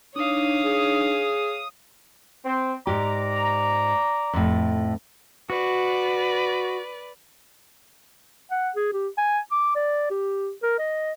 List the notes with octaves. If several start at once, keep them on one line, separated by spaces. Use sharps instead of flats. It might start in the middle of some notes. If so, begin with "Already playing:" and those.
D4 D#4 C#5 F5 D#6
G#4
C4 C5
G#2 G4 D5 A#5
F2 A2
F#4 B4 D5
F#5
G#4
G4
G#5
D6
D5
G4
A#4
D#5